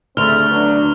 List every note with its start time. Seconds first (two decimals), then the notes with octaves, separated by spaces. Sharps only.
0.17 D2 C#3 A3 C4 F6 F7
0.50 F#3 B3 D4